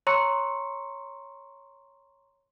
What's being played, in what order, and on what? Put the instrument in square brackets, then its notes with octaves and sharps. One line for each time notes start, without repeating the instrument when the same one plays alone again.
[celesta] C#5 A#5 C6 C#6 E6 C#7